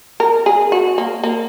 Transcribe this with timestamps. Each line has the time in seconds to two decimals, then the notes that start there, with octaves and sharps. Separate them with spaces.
0.20 A#4
0.46 G#4
0.72 F#4
0.98 A#3
1.24 A#3